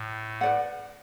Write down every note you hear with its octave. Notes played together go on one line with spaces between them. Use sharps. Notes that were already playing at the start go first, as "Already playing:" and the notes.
Already playing: A2
B4 D5 F#5